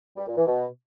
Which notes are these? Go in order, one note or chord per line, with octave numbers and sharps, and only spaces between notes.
G3
A#2
E3
B2